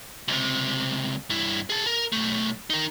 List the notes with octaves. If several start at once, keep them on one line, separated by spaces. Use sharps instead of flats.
C#2 C3
G2 E4
G#4 A5
A#4
B1 A3
D#4 A#4